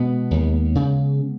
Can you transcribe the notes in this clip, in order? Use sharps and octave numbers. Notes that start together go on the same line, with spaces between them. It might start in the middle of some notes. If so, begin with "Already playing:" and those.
Already playing: B2 G#3 B3
D#2
C#3